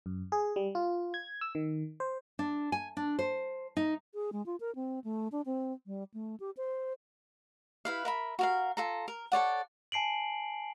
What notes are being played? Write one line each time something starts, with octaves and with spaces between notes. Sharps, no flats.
F#2
G#4
G3
F4
G#6
E6
D#3
C5
D4
G#5
D4
C5
D#4
G#4
G#3
F4
A#4
C4
A3
D4
C4
G3
A3
G4
C5
E4 B4 F5
A#4 E5 B5
F#4 A#4 F5
F4 A4 A#5
A#4
A4 C#5 D5 F#5
G#5 A5 C7 D7 F#7